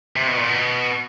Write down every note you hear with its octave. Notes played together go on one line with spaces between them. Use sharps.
C3
B2
A#2
B2